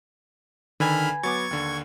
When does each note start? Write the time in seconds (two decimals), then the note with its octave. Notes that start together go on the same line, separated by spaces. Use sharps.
0.80 D3 D#3 B4 G#5 B5 F6
1.23 F#3 B3 C#6 D6 G#6 A6
1.51 D#2 D3